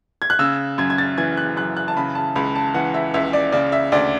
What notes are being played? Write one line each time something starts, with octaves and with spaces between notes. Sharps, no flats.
G#6
F#6
C#3 E6
F#2 G#6
G#6
A6
E3 G#6
F#6
F#2 F#6
F#6
A5
C#3 B5
A5
C#2 B5
A5
E3 F#5
E5
C#2 E5
D5
C#3 D5
E5
D2 D5